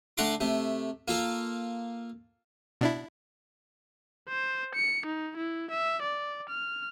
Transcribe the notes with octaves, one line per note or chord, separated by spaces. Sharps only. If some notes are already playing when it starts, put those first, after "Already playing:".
D3 A3 F#5 A#5 C6 D6
C3 A3
A#3 F4 A4
B2 D4 E4
C5
C#7
D#4
E4
E5
D5
F6